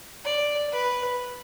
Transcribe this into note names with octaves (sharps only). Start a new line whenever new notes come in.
D5
B4